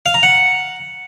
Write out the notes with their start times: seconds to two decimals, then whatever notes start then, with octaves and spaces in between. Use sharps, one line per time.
0.06 F5
0.14 A#5
0.23 F#5